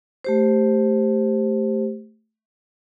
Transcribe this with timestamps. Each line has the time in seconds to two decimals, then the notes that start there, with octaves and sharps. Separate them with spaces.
0.25 A3 G4 C5